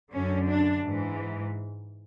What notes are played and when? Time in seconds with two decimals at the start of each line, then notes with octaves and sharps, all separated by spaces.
0.11 F#2 D3 C#4
0.47 D4
0.84 G#2 E3